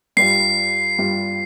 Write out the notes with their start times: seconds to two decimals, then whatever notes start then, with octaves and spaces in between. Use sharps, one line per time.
0.17 G2 G3 F4 C7
0.98 G2 G3 F4